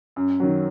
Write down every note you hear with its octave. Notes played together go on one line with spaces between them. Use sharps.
F#2
D#3 F#3